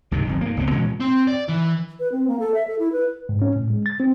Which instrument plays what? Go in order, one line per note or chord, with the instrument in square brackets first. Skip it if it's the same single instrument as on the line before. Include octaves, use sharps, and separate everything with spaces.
[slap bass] C#2 G2 C3 D#3
D1 G1 F2
G#2 A#3
F#1 C#2 B3 C4
A#2 E3 G#3 C#4
[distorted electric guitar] C4
D5
E3
[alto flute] B4
C4
A#3
A4
E5
A4
E4
B4
[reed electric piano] G#2
C#4
A2
G#3
A6
C4